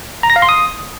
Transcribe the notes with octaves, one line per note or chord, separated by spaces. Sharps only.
A#5
A#6
F5
C6
D#6